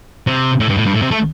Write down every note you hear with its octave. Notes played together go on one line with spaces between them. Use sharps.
C3
A2
G2
A2
G2
A2
C3
A3